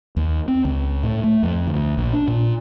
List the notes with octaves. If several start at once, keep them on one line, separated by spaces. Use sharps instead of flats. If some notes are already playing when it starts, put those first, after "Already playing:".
D#2
C4
C#2
A2
A3
F2
D2
A#1
D4
A#2